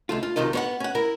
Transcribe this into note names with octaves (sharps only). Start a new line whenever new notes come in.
C#2 A3 F4
F4
B1 C3 D#3 F4 D#5
B3 C#5 F#5
C#4 F#5
E4 A#4